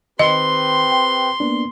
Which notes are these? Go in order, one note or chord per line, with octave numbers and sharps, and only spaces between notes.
D#3 C4 G4 B4 D#5 C6
G5
A#3 B3 D4